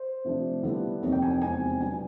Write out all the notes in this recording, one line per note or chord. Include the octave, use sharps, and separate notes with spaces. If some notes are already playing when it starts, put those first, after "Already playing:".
Already playing: C5
C3 F3 A3 D4
D3 G3 B3 E4
F2 C3 F3 A#3 D#4 C#5
G5
G#5
G5
E2 C3 F3 G#3 C4 G#5
B2 F#3 B3 D4 G#5